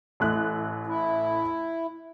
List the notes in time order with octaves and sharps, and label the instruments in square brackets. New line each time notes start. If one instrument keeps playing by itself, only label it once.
[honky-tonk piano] A1 A3 F#6
[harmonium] E4